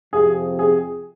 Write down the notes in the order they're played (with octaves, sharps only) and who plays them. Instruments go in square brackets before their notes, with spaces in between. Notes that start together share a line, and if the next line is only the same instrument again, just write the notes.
[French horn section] F2 C3 F3 C4 G4 [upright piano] G#4
[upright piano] G#4